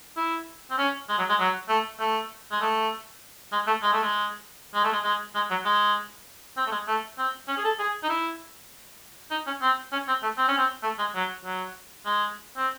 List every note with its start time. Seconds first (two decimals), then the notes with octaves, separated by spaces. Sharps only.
0.17 E4
0.71 C4
0.78 C#4
1.09 G#3
1.19 F#3
1.29 G#3
1.39 F#3
1.69 A3
2.00 A3
2.52 G#3
2.61 A3
3.52 G#3
3.67 A3
3.83 G#3
3.93 A3
4.03 G#3
4.75 G#3
4.84 A3
4.93 G#3
5.04 G#3
5.35 G#3
5.50 F#3
5.65 G#3
6.57 C4
6.67 A3
6.72 G#3
6.87 A3
7.18 C4
7.48 C#4
7.58 G#4
7.64 A4
7.79 G#4
8.03 D#4
8.09 E4
9.31 D#4
9.47 C#4
9.62 C4
9.92 C#4
10.08 C4
10.23 A3
10.38 C4
10.48 C#4
10.58 C4
10.83 A3
10.99 G#3
11.15 F#3
11.45 F#3
12.06 G#3
12.57 C4